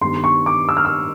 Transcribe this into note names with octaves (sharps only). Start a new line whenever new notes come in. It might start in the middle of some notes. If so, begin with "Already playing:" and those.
G2 D#3 G3 B3 C6
C#6
D6
E6
F6
E6